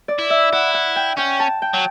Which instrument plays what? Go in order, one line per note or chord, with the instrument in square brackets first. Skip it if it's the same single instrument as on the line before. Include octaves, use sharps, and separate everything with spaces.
[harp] D5
[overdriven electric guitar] E4
[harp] E5
[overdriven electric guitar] E4 [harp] F#5
[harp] F#5
G5
[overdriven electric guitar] C#4 [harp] G5
[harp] A5
G5
[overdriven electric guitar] F#3